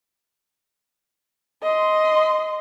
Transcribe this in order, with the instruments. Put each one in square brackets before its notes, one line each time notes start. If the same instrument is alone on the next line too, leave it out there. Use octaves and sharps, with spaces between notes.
[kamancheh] D#5 C6